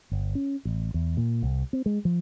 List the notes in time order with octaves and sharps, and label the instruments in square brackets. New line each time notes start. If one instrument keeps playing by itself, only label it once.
[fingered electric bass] G1
C#4
A1
E2
A#2
C2
C4
G#3
F3